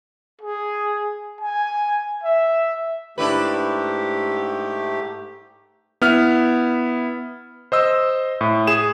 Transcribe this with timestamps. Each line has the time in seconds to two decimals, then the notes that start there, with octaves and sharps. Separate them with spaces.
0.41 G#4
1.41 G#5
2.24 E5
3.18 G#2 A3 D4 E4 G4 B4
6.02 B3 E4 F6
7.72 C5 D#5 E6
8.41 A2
8.67 G#4 E7